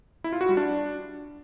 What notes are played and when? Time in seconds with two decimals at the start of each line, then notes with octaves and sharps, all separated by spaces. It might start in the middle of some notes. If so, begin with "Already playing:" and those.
0.24 E4
0.33 F4
0.41 F#4
0.49 G3
0.57 D4